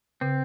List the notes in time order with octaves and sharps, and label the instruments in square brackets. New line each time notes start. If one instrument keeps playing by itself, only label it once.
[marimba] C#3 [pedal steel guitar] C4